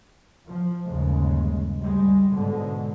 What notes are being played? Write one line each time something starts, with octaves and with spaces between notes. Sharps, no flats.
F3
G1 D#2 C#3 G#3
D2 G3 G#3
G#2 B2 D3 G#3